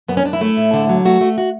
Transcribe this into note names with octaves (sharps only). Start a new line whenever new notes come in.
F#2 B3
C#4
F#2 D4
E4
A3
A2
D3
F#3
A3 F#4
A3
F#4